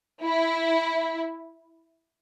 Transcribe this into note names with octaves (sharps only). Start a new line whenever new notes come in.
E4